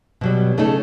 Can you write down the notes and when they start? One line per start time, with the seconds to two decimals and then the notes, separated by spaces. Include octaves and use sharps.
0.21 B2 F#3 G3
0.57 C#3 A3 C#4 D#4 G#4 A4